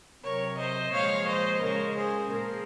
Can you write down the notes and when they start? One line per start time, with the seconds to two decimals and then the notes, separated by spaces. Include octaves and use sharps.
0.25 C3 F#3 A#4 C#5
0.59 C5 D#5
0.93 A#2 F3 G#3 C#5 F5
1.28 C5 D#5
1.62 C#3 G#3 A#4 C#5
1.97 G#4 C5
2.31 A#2 F3 G#3 A#4